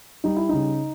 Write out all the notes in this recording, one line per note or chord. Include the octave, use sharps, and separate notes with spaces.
G3 D#4
E4
C#3 D#4